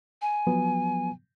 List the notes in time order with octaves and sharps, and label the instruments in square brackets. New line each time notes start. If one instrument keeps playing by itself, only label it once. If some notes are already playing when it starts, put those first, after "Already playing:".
[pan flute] G#5
[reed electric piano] F3 F#3 B3